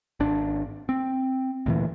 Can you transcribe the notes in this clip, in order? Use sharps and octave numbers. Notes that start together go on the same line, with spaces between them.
G#1 D4
C4
D2 A#2 E3